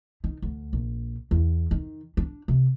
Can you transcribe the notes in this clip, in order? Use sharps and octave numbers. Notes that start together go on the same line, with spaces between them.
D#3
D2
A#1
E2
D#3
D4
C3